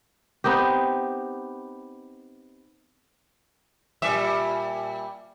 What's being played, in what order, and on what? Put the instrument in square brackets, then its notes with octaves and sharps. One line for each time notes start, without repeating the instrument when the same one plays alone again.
[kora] B3 C4 D#4 G4
[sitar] A#2 G3 E5